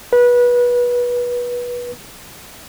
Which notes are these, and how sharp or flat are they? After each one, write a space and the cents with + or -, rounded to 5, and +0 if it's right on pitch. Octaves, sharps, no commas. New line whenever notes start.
B4 -25